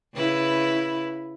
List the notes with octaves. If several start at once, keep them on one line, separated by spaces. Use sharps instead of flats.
C#3 E4 B4